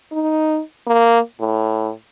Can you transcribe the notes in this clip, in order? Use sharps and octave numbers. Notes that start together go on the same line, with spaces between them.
D#4
A#3
A2